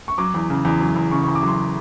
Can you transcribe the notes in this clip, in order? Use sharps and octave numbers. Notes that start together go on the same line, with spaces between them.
C#6
F#3 D6
E2
C#3
E2
F#3
E2
C#3 C#6
C#6
E2
D6
F#3 C6